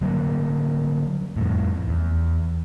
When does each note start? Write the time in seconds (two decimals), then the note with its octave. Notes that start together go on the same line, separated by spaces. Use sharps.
0.01 D3 F#3 G3 A#3
1.37 F2 A2
1.88 E2